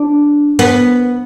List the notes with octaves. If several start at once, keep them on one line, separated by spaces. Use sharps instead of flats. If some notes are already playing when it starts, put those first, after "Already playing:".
Already playing: D4
B3